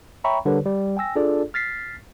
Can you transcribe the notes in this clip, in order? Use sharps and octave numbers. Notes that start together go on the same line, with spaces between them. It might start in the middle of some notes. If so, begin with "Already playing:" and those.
C#5 E5 G5 A#5 B5 C#6
D3 G3 G4 A#4 B4 C#5
G3
G5 G#5 E6 A#6
D4 F4 G#4 A4 D5
F6 A6 B6 C7